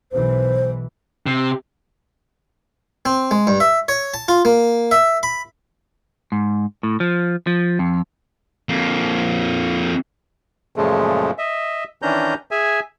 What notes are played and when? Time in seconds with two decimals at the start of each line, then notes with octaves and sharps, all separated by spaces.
0.12 B1 E3 C5
1.26 C3
3.05 C4
3.31 G#3
3.47 G2
3.60 E5
3.88 C#5
4.14 A5
4.28 F4
4.45 A#3
4.91 E5
5.23 B5
6.32 G#2
6.83 A2
7.00 F3
7.47 F3
7.79 F2
8.69 F2 A#3
10.76 F#2 A#2 C#3 F3 G#3 A3
11.38 D#5 E5
12.02 D#3 E3 C#4 D4 A#5 G6
12.51 G#4 E5 G#5